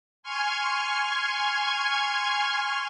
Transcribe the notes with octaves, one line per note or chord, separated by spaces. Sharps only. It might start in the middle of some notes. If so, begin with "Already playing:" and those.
G#5 C6 C#6 F6 G#6